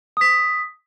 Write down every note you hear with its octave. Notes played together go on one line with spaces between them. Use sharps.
D#6 B6